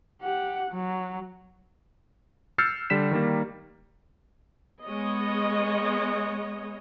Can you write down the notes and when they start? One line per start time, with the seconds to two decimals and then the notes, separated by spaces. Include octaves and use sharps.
0.22 G4 F#5
0.71 F#3
2.58 E6 F6 G6 A6 C7 C#7
2.90 D3 G3 B6 E7
3.11 D#3 G3 A#3
4.84 G#3 B3 C#5 D#5